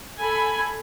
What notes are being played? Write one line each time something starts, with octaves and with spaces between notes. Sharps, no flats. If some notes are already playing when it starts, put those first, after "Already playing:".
A4 G#5 B5